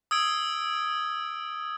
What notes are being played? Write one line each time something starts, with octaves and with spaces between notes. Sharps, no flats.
D#6 E6 G#6 D7